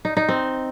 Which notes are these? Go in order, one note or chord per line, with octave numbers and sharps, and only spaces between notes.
D#4
D#4
C4